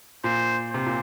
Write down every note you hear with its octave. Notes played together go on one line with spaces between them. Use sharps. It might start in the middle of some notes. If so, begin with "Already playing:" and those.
A#2 C5
C3 C5
A#2